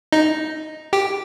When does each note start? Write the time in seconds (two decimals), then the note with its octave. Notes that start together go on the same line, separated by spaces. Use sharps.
0.13 D#4
0.93 G4